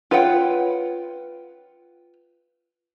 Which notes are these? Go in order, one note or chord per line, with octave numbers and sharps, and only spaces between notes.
F4 B4 C#5 F#5 G5